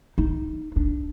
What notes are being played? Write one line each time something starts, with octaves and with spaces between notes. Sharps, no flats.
D#4
D4